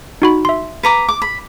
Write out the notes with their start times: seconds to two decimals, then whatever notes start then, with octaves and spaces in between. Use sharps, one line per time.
0.22 D#4 F#4 B5
0.45 E5 C6
0.83 B4 A#5 D6
1.09 D6
1.22 B5